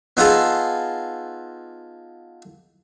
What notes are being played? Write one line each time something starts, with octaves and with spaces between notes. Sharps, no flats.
B3 D#4 F4 G#4 A4